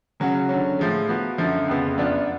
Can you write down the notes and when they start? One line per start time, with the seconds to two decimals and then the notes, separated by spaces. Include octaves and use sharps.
0.20 C#3 F#3 C#4 F#4
0.49 D3 F#3 C#4
0.79 A2 F3 G#3
1.08 F3 B3 F#4
1.38 F#2 D3 F3
1.68 F2 C#3 F3 B3
1.97 F#2 F3 B3 D4 F4